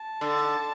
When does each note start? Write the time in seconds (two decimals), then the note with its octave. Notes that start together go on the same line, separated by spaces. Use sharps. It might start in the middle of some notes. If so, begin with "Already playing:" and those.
Already playing: A5
0.21 D3